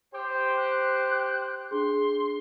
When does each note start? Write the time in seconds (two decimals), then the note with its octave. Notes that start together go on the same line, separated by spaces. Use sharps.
0.14 G4 C5
0.57 F#6
1.71 D4 G#4 C6